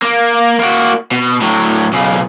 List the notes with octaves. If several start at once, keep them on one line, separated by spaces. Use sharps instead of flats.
A#3
A#3 F#4
B2
A2 F#3
B1 C#3